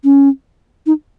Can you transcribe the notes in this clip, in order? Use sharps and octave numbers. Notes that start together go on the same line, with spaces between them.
C#4
D#4